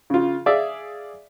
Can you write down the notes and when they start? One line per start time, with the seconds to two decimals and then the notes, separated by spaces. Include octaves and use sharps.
0.10 C#3 F4
0.46 G#4 D5 E5 F5